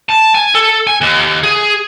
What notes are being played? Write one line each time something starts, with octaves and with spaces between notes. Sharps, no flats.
A5
G#5
A4
G#5
D#2
G#4